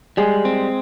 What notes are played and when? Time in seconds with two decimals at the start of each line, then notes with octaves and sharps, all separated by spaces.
0.17 G3 G#3 G#4
0.45 C4